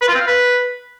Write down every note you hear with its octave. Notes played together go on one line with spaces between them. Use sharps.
B4
F4
C4
F5
B4